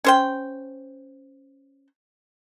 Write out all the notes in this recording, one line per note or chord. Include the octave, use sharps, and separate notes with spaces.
C#4 C5 G5